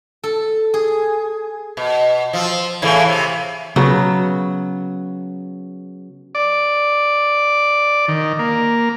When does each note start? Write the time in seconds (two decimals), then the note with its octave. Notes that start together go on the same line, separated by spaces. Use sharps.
0.24 A4
0.74 G#4
1.77 B2
2.33 F3 C4
2.82 A2 C#3 E3
3.08 C3
3.76 C#3 F#3 B3
6.35 D5
8.08 D#3
8.39 A#3